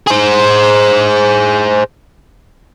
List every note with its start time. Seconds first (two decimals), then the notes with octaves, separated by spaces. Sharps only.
0.07 G#4 C5